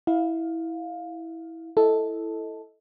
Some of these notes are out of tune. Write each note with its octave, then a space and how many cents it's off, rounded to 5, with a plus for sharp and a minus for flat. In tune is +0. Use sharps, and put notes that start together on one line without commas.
E4 -10 F5 +15
E4 +0 A4 +0 D#5 +20